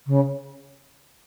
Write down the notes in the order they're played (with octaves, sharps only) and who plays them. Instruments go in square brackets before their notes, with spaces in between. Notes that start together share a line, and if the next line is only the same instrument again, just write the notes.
[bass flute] C#3